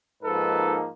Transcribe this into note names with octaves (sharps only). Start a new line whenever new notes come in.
G#2 F3 A#3 D#4 A4 B4